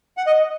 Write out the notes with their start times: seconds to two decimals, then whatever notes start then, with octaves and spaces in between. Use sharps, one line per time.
0.17 F#5
0.27 D#5